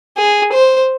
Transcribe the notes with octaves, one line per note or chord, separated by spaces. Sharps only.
G#4
C5